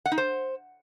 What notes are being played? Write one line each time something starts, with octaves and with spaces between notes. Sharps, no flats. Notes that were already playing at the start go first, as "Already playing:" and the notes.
F#5
D#4
C5